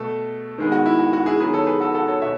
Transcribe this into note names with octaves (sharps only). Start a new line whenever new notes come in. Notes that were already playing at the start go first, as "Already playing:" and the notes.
Already playing: B2 A3 A4
D#3 G#3 B3
F#4
E4
F#4
F#4
E4 G#4
D#3 F#3 B3 G#4 B4
A4 C#5
G#4 B4
F#4 A4
F#4 A4
A4 C#5
B2 C#5 E5